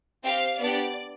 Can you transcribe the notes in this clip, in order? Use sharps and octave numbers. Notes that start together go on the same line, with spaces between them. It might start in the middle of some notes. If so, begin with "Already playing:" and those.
C4 G4 F5
B3 D4 G4 D5